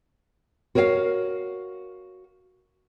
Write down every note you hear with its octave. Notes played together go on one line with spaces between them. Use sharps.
F#4 A#4 C#5 D#5 F5